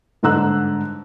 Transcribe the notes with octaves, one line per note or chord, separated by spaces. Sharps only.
G1 G#2 D3 A#5 E6 F#6